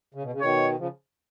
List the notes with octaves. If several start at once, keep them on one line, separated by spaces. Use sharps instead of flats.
C#3
B2
C#3
B2 D#3 C#5
C#3 F3